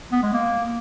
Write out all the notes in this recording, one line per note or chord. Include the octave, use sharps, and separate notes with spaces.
B3
G#3
A#3